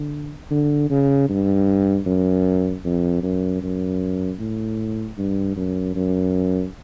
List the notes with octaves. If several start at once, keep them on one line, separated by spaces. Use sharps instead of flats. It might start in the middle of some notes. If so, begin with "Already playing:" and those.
Already playing: D3
D3
C#3
G2
F#2
F2
F#2
F#2
A2
G2
F#2
F#2